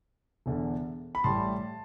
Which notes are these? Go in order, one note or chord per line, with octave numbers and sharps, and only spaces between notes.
E1 E2 D3
B5
A1 A2 G3 A5 C6